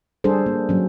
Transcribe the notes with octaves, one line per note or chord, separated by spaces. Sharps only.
G3 D4 G#4 A4 C5
A#3
F#3 C#4